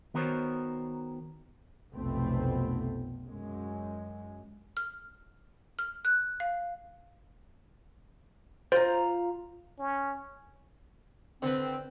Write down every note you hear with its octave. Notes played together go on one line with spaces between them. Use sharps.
D#3 B3 F#4 A#4 C5 C#5
F1 B1 F2 A3 B3 C4
F#2 G#3
F6
F6
F#6
F5
F4 C5 A#5
C#4
D3 C4 B4